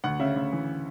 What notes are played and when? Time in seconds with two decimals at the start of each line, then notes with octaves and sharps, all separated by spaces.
0.04 D2 F#5
0.20 C#3 E5
0.36 D2
0.52 E3